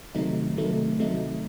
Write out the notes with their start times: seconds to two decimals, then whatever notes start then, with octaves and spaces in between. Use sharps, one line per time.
0.15 C3 D#3 F#3 A3 D#4
0.56 C3 D#3 F#3 A3 D#4
0.99 C3 D#3 F#3 A3 D#4